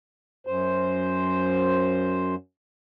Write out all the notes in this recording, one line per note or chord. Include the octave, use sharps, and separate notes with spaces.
F#2 C5